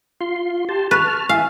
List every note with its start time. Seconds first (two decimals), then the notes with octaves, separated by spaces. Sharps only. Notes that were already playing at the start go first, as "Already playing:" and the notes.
0.21 F4 C6
0.69 G4 A5 C6
0.91 B4 A5 C#6 F6
1.29 E4 E5 F5 G#5